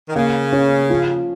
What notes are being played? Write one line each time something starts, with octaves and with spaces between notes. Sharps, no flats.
D#3
C#3 A#3
C#4
F3